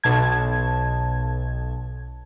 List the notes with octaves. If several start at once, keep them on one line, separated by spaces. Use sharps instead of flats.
B1 B2 A5 G#6